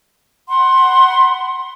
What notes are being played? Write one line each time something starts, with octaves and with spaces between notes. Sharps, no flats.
F#5 B5 C6